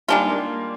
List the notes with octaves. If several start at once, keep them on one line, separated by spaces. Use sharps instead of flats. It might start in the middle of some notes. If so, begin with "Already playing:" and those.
D#3 G3 G#3 A#3 D4 F4
G3 A#3